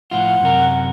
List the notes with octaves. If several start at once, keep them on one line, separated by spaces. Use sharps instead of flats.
A2 F3 F4 F#5
F#2 C3 A#4